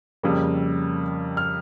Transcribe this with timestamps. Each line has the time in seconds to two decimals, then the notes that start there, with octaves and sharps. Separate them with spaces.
0.23 F2 C#3 G3 A#3
1.37 F6